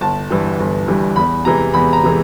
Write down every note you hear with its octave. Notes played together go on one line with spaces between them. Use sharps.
G1 A5
G2 E3 G3
G1
G2 E3 G3
E2 B5
C3 E3 G#3 A#5
E2 B5
A#5
C3 E3 G#3